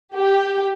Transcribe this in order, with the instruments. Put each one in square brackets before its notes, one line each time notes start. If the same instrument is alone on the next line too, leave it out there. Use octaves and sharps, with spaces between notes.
[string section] G4